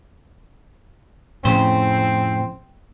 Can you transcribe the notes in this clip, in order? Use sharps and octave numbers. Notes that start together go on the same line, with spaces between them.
F2 A2 C#3 C4 C5